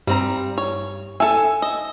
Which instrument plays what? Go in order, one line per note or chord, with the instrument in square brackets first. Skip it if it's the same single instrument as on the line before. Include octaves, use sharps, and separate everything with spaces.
[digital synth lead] G2 [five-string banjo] G3 C4 A#5
[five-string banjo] C#5
[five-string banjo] A4 E5 [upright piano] G#5
[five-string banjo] D#5 [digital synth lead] E6